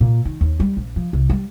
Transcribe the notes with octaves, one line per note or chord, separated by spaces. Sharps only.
A#2
D#3
D#2
G3
A#1
F3
C2
G3